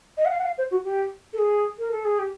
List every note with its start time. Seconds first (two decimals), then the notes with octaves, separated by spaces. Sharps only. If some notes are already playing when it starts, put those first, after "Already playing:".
0.17 D#5
0.25 F#5
0.30 F5
0.39 F#5
0.44 F5
0.58 C5
0.71 F#4
0.84 G4
1.33 A4
1.38 G#4
1.79 A#4
1.92 A4
2.05 G#4
2.19 G4